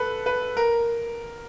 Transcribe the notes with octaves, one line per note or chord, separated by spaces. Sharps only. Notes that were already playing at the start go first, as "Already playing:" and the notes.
Already playing: A4 B4
B4
A#4